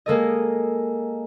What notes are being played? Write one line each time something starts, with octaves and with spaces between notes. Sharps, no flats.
G#3 A#3 A4 D#5